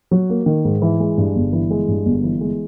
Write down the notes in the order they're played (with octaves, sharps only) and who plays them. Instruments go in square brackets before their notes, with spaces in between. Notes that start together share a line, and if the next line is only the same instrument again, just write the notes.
[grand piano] F#3
A#3
D#3
G#2
E3
G#3
G2
G1
E3
G#3
G2
G1
E3
G#3